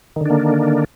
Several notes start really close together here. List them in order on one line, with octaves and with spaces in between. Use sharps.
D#3 D3 D4 A#3